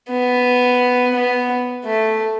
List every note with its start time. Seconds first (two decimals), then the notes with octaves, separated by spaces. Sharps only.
0.10 B3
1.15 B3
1.85 A3